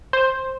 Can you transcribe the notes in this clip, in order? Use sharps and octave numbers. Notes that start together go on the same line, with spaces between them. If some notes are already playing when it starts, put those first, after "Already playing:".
C5